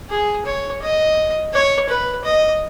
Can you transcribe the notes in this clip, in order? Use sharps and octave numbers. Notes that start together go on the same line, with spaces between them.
G#4
C#5
D#5
C#5
B4
D#5